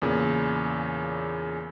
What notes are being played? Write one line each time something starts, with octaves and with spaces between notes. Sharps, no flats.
E2 A#2 C#3